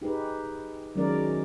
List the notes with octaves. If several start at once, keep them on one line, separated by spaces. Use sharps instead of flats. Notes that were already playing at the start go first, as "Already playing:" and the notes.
D#4 G4 G#4 B4
D#3 F#3 G#3 C#4 A#4 D5